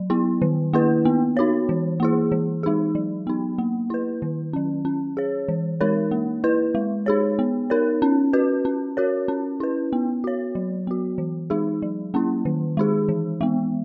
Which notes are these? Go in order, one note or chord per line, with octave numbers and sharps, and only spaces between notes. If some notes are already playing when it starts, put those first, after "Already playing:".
Already playing: F#3
B3 E4
D#3
A#3 E4 B4
B3
D#4 F#4 C#5
E3
A#3 E4 G#4
E3
G#3 D#4 G#4
F#3
B3 D#4
A#3
E4 B4
D#3
F#3 C#4
C#4
G#4 C#5
E3
G#3 D#4 A#4 C#5
A#3
E4 B4
G#3
D#4 G#4 C#5
B3
D#4 A#4 C#5
C#4
F#4 B4
C#4
F#4 A#4 C#5
C#4
E4 B4
B3
F#4 C#5
F#3
B3 F#4
E3
G#3 D#4 G#4
F#3
A#3 C#4 E4
D#3
G#3 D#4 G#4
E3
G#3 B3